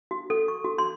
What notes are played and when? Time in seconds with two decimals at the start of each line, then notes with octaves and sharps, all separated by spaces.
0.11 F#4
0.30 A4
0.48 C#6
0.64 F#4
0.78 C6